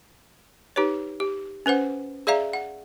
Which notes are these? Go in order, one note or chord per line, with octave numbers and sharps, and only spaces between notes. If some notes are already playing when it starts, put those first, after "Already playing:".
D#4 G4 B4 C#5
G4
C#4 B4 C5 F#5
G#4 D5 E5 F5 A#5
F#5